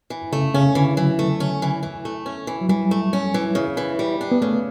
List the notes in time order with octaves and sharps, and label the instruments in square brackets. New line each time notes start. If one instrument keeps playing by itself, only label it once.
[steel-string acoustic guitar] E3
[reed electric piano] C#3 [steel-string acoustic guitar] A3
[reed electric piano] C#3 [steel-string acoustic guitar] C#4
[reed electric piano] D3 [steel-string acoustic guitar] E3
[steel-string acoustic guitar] E3 [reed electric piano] F#3
[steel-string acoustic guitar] A3
C#4
E3
E3
A3
C#4
E3
[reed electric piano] F#3
[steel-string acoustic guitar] E3 [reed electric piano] G3
[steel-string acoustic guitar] A3
C#4
E3
C#3
E3
G3
D4
[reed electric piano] B3
[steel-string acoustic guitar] C#3 [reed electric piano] A3